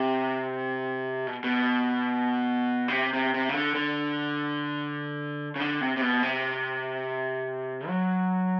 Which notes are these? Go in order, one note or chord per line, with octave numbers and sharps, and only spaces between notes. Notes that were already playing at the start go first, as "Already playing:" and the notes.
Already playing: C3
B2
B2
C#3
C3
C3
C3
C#3
D3
D3
C#3
D3
C3
C3
B2
C3
F#3